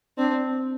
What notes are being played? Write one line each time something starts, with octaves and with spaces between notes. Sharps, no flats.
C4 D4